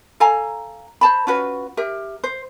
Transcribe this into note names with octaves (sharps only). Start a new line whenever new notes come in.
A4 F5 G#5 A#5
C5 A5 B5
C#4 F4 F#4 B4
G4 A#4 E5
C5